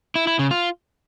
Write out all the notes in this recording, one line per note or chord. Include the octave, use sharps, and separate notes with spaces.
E4
E4
C#3
F4